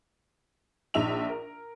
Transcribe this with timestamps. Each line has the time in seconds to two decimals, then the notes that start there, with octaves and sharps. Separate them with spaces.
0.94 A#1 D#4 E5 F7
1.29 A#4